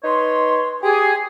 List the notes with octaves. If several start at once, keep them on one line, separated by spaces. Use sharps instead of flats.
D#4 B4 C#5 C6
G4 G#4